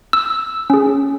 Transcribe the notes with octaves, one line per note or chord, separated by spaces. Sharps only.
E6
C#4 G#4